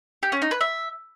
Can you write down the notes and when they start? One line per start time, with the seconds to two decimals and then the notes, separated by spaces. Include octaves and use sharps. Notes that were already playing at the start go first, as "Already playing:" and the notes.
0.23 G4
0.32 C#4
0.42 D#4
0.51 B4
0.61 E5